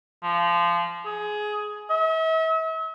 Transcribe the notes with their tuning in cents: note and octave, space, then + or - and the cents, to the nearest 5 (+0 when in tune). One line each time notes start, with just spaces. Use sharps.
F3 -20
G#4 +15
E5 -40